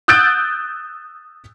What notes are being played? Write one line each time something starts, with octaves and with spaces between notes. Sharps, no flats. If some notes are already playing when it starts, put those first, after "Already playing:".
D#6 E6 F#6 G6 A6 D7